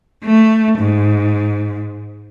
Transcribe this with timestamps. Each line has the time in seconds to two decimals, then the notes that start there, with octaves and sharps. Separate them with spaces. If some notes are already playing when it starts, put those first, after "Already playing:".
0.25 A3
0.79 G#2